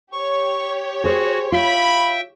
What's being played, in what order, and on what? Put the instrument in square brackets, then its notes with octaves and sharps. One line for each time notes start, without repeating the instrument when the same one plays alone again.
[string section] G4 C#5 [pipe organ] C#6
[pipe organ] F#4 [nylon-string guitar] G#4 C5
[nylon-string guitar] F4 [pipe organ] E5 G5 [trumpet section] B5